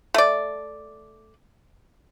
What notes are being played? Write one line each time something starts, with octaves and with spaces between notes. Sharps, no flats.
A3 D5